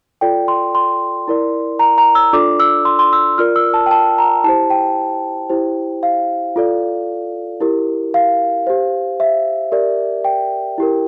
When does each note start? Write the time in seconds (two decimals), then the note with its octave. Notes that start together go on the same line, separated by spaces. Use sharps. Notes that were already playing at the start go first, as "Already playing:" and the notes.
0.21 F4 A4 D5 G5
0.48 C6
0.75 C6
1.28 E4 A#4 D5
1.79 A#5
1.98 A#5
2.15 E6
2.33 D4 F4 A4 D5 D6
2.60 E6
2.85 C6
2.99 C6
3.13 E6
3.38 F4 A#4 D5 F6
3.56 E6
3.74 A5
3.86 G5
3.91 A5
4.18 A#5
4.44 E4 G4 C5 A5
4.70 G5
5.49 E4 G4 C5
6.03 F5
6.56 F4 A4 D5
7.60 E4 G4 A#4
8.14 F5
8.67 G4 C5
9.20 E5
9.72 G4 A#4 D5
10.25 G5
10.78 E4 G4 A#4